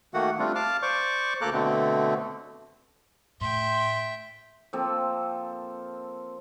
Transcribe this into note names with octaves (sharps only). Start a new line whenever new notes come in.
D#3 A3 A#3 F#4 F#5
G3 A3 C4 D4 F4
F5 A5 D6 F6
C5 D5 C#6 D6
D2 A#3 A4 A#5 D6 F#6
B2 D3 A3 C4
A2 E5 G5 C6
F3 A#3 C4 A4